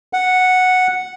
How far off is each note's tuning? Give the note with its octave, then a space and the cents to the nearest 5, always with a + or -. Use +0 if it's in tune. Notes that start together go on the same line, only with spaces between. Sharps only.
F#5 -5